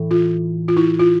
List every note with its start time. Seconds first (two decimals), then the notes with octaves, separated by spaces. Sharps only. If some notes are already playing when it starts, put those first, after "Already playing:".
Already playing: A2 E3
0.11 F4
0.68 F4
0.77 E4
0.99 F4